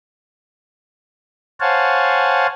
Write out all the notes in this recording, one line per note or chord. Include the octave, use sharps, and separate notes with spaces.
C5 C#5 F5 F#5 G#5 A5